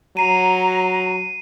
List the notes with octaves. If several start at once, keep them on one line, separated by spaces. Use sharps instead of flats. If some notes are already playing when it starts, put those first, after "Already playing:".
F#3 A#5 C7 D#7